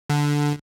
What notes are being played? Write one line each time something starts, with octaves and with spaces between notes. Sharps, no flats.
D3